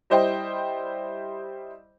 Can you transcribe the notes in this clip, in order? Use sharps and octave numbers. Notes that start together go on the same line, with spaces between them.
G3 E4 C5 D#5 G5